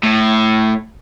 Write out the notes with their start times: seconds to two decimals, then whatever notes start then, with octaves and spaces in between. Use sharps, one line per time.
0.03 A2